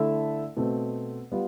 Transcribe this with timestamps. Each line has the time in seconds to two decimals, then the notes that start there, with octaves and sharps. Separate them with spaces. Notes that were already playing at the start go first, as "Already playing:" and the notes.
Already playing: D3 A3 E4 A4 E5
0.57 B2 A3 C4
1.32 G3 B3 F4